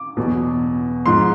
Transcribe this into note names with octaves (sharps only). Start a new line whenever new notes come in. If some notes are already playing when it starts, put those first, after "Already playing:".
Already playing: D6
E2 B2 F#3
G#2 F3 C6